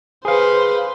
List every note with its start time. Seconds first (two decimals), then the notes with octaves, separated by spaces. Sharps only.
0.25 G#4 B4 C5 F5